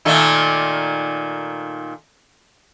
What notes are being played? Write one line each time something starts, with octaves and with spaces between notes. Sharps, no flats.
A#2 D#3 A3